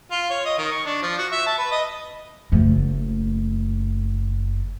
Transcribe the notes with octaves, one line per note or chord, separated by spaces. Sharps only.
F4
C#5
D#5
D#3
C#6
D4
F3
F#4
E5
A5
B4
D#5
F#1 A3